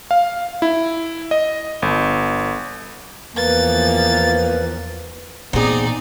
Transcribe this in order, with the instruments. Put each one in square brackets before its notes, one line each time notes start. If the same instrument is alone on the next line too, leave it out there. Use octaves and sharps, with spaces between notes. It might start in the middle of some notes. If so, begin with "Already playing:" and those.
[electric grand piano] F5
E4
D#5
G1
[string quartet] E2 F3 [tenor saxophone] A#3 [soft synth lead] B4 [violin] A6
[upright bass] A#2 E3 [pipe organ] B3 [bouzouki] C4 G#4 [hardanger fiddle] D#4 D5